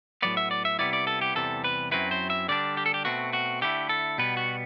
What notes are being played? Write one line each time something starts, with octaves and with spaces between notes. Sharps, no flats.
A2 F#3 B3 D5
E5
D5
E5
C3 G3 B3 E4 D5
D5
A4
G4
E2 C3 E3 G3 A4
B4
F#2 F#3 C4 E4 B4
C5
E5
D3 G3 D4 D5
G4
A4
G4
B2 A3 C4 F#4
F#4
D3 A3 E4 G4
A4
B2 G3 B3 B4
F#4